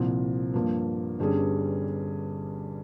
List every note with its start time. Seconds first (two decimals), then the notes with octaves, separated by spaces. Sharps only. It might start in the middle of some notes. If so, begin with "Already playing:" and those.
Already playing: C2 A#2 F3 C4
0.54 G2 F3 A#3
1.19 G1 G2 G3 C#4 G#4